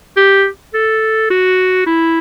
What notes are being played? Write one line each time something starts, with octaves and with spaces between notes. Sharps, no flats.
G4
A4
F#4
E4